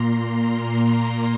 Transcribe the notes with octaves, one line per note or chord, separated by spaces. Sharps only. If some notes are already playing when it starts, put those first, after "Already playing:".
Already playing: A#2 A#3 A#5 C6
A#5
C6